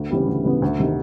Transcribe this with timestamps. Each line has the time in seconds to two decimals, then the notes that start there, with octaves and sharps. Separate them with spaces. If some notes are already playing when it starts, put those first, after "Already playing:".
Already playing: D2
0.10 C#3 E3 G3 B3
0.27 D2
0.45 C#3 E3 G3 B3
0.62 D2
0.79 C3 D#3